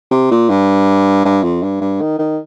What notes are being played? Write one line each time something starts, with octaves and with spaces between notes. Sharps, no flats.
C3
A#2
G2
G2
F2
G2
G2
D#3
D#3